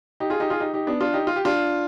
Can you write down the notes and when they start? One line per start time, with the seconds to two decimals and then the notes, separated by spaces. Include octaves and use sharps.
0.20 D#4 G4
0.30 F4 G#4
0.40 D#4 G4
0.50 F4 G#4
0.60 D#4 G4
0.74 D#4 G4
0.87 B3 D4
1.01 D4 F4
1.13 D#4 G4
1.27 F4
1.36 G4
1.45 D4 F4